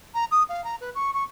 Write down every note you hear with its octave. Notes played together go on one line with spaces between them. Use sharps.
A#5
D#6
F5
A#5
B4
C#6
C#6